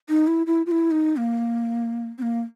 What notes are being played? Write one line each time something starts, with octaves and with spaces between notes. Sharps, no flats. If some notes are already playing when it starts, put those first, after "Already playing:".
D#4
E4
E4
F4
E4
D#4
A#3
C4
A#3